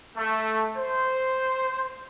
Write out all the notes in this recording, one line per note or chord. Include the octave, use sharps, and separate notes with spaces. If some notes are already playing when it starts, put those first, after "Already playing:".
A3
C5